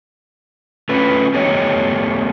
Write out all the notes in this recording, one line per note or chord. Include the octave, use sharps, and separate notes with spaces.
A3 C#4 F4 B4
A3 B3 G4 C#5 D#5